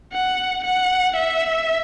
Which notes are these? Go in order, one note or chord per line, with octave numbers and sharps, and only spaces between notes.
F#5
F#5
E5